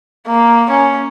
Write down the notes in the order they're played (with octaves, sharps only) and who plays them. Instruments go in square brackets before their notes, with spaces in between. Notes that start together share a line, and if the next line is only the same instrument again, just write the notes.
[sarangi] A#3
C#4